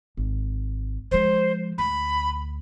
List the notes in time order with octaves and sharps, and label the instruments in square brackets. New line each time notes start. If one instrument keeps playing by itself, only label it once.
[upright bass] G#1
[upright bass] F3 G#3 [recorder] C5
[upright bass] D2 [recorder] B5